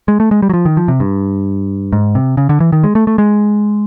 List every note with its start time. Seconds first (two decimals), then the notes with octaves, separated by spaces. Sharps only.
0.08 G#3
0.20 A3
0.31 G#3
0.42 G3
0.49 F#3
0.54 F3
0.65 D#3
0.77 F3
0.88 C3
1.00 G2
1.93 G#2
2.15 C3
2.37 C#3
2.49 D3
2.60 E3
2.72 D#3
2.84 G#3
2.95 A3
3.07 A3
3.18 G#3